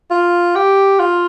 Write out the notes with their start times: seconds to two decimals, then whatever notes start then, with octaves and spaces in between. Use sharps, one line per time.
0.10 F4
0.55 G4
0.99 F4